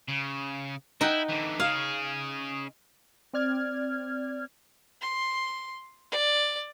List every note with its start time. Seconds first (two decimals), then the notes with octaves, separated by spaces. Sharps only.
0.09 C#3
1.01 D#4 E4 F#5 G5
1.29 D3 E3
1.60 C#3 G#4 F5
3.33 C4 D5 F6 G#6
5.01 C6
6.11 D5